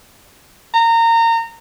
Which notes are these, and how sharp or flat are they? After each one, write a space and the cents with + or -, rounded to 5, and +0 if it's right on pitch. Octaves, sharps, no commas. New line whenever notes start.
A#5 -25